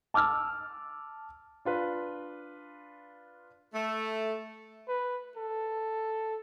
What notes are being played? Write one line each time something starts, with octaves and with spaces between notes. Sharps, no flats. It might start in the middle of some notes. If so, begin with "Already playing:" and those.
A5 D6 E6 F6
D4 F4 B4
A3
B4
A4